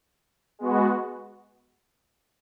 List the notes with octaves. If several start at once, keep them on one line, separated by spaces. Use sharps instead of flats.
G#3 B3 F#4